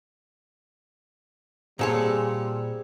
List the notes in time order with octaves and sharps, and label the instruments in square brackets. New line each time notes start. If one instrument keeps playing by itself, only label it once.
[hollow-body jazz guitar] A#2 A4 C#5 [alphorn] G3 [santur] C4 G#4 E6